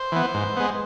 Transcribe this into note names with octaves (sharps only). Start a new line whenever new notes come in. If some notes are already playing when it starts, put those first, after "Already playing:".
Already playing: C5
E3 B3
G#2
G#3 B3